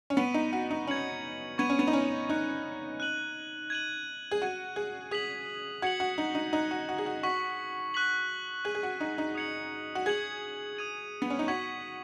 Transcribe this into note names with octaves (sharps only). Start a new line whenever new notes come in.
C#4
B3 C#6 B6 D#7 F#7
D#4
F#4
D#4
C#4 G#6 C#7 F#7
B3 C#6 G#6 D#7
C#4
B3
D#4
C#4
D#4 C#6 F#6 D#7
F#6 D#7 F#7
G#6 D#7 F#7
G#4
F#4 G#6 D#7 F#7
G#4
G#4 D#6 B6 F#7
F#4 G#6 C#7 F#7
F#4
D#4
D#4
D#4 D#6 F#6 C#7
F#4
F#4
G#4
F#4
F#4 C#6 B6 F#7
C#6 F#6 B6 F#7
G#4 C#6 F#6 D#7 F#7
G#4
F#4
D#4
D#4
D#6 G#6 C#7 F#7
F#4
G#4 G#6 C#7 F#7
D#6 G#6 D#7 F#7
B3
C#4
D#4
F#4 C#6 G#6 B6 F#7